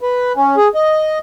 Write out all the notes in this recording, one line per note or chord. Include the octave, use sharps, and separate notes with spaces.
B4
C#4
G#4
D#5